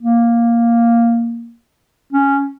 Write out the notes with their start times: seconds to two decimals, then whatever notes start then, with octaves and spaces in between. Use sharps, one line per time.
0.02 A#3
2.13 C#4